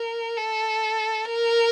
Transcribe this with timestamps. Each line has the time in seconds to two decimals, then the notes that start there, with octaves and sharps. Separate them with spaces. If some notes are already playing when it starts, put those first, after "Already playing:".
Already playing: A#4
0.37 A4
1.26 A#4